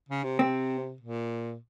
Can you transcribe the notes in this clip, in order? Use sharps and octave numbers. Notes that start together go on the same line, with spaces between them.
C#3
C3
C3 C4
A#2